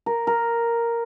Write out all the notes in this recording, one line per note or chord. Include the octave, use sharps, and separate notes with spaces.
A#4
A#4